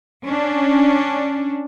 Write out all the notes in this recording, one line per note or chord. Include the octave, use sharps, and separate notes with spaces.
C#4 D4